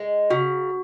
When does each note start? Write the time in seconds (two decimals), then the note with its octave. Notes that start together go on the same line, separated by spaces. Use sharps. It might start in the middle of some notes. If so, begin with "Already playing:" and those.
Already playing: G#3
0.30 C#3 F#4